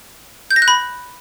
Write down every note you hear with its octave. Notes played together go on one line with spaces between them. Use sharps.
G6
A#6
F#6
B5